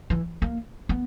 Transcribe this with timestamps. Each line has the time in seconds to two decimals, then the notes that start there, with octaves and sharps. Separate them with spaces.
0.10 E3
0.42 A#3
0.89 B3